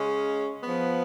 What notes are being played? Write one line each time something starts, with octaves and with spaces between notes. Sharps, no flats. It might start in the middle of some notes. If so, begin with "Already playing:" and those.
Already playing: C#3 G#3 C#4
F3 B3